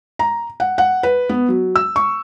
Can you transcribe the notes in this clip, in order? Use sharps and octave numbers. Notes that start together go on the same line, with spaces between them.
A#5
F#5
F#5
B4
B3
F#3
E6
C#6